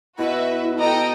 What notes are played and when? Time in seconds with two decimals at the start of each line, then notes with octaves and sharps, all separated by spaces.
0.19 B2 E4 F#4 B4 E5
0.79 A4 D#5 G5 A#5